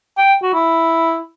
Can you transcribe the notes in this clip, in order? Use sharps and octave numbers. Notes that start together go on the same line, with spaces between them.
G5
F#4
E4